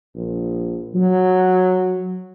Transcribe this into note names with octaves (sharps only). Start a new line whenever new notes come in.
A#1
F#3